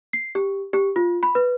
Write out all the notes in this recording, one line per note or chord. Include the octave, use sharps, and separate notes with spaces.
C7
G4
G4
F4
B5
B4